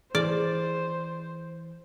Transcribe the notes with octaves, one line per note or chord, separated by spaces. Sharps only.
E3 G#4 C5 D5